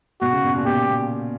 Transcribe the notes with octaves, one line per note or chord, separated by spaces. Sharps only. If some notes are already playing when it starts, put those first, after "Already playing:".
B2 F#4
C#3
B2
A#2
B2 G4
B2